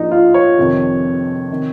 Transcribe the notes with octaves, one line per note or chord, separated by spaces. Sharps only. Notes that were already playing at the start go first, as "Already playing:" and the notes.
Already playing: A#1 A#2 D#4
F4
C#5
F1 F2 C3 D#3
C3 D#3